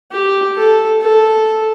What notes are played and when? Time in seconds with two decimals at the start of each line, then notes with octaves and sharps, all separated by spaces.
0.12 G4
0.56 A4
1.01 A4